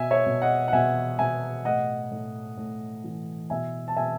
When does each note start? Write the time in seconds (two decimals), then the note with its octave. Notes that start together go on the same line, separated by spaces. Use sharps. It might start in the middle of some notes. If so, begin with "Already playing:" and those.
Already playing: B2 E5 G#5
0.11 C#5 E5
0.26 B2
0.42 D#5 F#5
0.68 F#5
0.73 B2 E5 G#5
1.19 B2 E5 G#5
1.65 A2 D#5 F#5
2.11 A2
2.57 A2
3.04 E3
3.50 B2 E5 G#5
3.88 A5
3.96 B2 E5 G#5